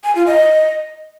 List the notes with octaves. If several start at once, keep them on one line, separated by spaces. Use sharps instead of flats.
G#5
F4
D#5